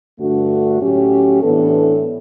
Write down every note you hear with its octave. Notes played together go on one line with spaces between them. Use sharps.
G2 D3 A3 D4 F#4
A2 F#3 C#4 G4
A2 E3 B3 D4 A4